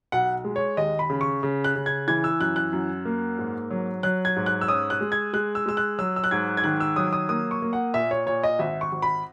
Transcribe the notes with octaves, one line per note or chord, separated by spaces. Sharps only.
B1 F#5
G#3
C#5
D#2 D#5
B5
C#3
C#6
C#3
F#6
C#3
G#6
E3 G#6
E6
F#2 F#6
F#6
F#2
A#3
G#2
F#3
F#3 F#6
G#6
G#2
F#6
E6
C#4 D#6
F#6
G#3
G#6
G#3 F#6
E6
G#3 E6
F#6
F#3 E6
E6
F#6
G#2 G#6
G#6
D#3 F#6
E6
F#3 D#6
D#6
A#3 D#6
C#6
A#3
F#5
A#2 E5
C#5
A#2 C#5
D#5
G#1 E5
C#6
G#1
B5